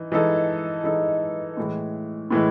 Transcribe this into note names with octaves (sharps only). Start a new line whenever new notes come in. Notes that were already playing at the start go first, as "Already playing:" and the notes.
Already playing: E3 D#4
E3 G#3 D#4 A4
E3 G#3 D#4 A4
A2 E3 G#3
A2 E3 G#3